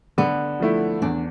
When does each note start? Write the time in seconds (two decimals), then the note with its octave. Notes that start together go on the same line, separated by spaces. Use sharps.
0.18 D3 B3
0.60 F3 A3 E4
1.02 E2 D4